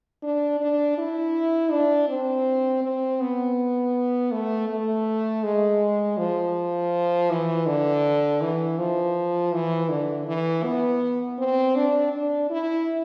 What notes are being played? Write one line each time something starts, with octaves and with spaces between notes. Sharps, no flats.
D4
D4
E4
D4
C4
C4
B3
A3
A3
G#3
F3
E3
D3
E3
F3
E3
D3
E3
B3
C4
D4
D4
E4